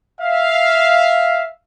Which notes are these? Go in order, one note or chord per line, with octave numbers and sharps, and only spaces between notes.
E5 F5